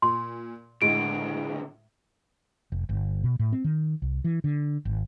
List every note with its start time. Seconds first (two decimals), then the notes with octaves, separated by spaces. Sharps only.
0.02 A#2 C6
0.82 C#2 A2 D3 G#3 D7
2.72 F1
2.89 G1
3.24 B2
3.39 A2
3.53 C4
3.64 D#3
4.02 C2
4.24 E3
4.44 D3
4.85 G#1